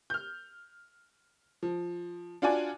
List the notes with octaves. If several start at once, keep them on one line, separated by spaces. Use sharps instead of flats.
F6 G6
F3
D4 F4 F#4 D5 G#5